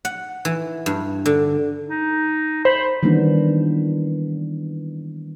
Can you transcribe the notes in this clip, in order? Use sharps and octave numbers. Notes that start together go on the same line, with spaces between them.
F#5
E3
G2
D3
D#4
C5 B5
D#3 E3 G3 A#3 B3 D4